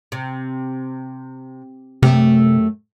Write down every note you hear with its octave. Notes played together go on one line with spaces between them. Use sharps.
C3
F#2 C3 A3 G4